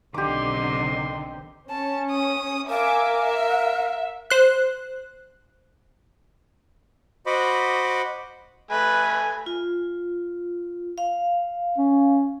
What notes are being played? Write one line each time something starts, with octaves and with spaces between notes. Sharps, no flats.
B1 D3 D#3 C4 D#4 G4 C6 D6
C#4 A5
D#6
A#4 E5 F5 G#5 D6
E5
C5 F#6
F#4 C5 D#5 F#5 B5 D6
A3 B4 G#5
F4
F5
C#4